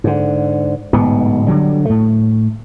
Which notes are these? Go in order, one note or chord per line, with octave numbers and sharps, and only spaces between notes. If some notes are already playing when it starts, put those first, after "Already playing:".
G#2 D3
D1 G#2 B2 B3
D3 F#3 G3
A2 A3